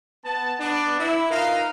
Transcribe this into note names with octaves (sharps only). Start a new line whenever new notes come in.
B3 A5
B3 D4
E4
D#4 F4 A#4 B4 D#5 F5